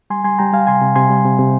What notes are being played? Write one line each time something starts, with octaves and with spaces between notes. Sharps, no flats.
G3 G#5 C6
G3 G#5 C6
G3 G5 A#5
G3 F5 G#5
C3 G#5 C6
C3
C3 G#5 C6
G3
C3
C3